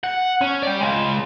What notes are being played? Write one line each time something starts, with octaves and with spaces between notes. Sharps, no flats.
F#5
C#4
D5 G5
C#3 G#3